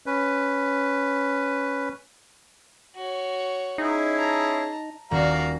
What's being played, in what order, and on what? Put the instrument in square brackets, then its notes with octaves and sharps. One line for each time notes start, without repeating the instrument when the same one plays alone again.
[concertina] C#4 B4
[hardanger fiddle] F#4 C#5
[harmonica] C#4 E4 G#4 [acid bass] D#4
[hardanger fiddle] A5 A#5
[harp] D#1 [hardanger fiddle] F#4 [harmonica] D5 F5 A#5